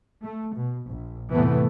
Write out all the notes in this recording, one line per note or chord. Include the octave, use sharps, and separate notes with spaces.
A3
B2
A#1
F2 A2 C3 E3 A3 B3